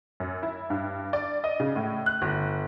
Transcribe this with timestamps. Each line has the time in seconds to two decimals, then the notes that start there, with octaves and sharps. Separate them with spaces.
0.20 F#2
0.43 E4
0.70 G2
1.13 D5
1.44 D#5
1.60 C#3
1.76 A2
2.06 F#6
2.22 G1